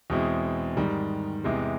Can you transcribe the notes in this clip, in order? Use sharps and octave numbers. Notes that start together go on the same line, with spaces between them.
E2 B2 G#3 C4 E4
G#2 D#3 G3
E2 C3 E3 G#3